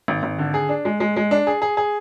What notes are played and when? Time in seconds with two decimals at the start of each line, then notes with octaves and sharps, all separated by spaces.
0.08 G#1
0.23 G#1
0.38 D3
0.54 G#4
0.69 D4
0.85 G#3
1.00 G#3
1.16 G#3
1.31 D4
1.47 G#4
1.62 G#4
1.77 G#4